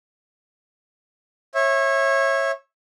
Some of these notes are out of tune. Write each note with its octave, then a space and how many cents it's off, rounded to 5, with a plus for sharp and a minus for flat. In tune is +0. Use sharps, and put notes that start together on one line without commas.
C#5 -25 E5 +0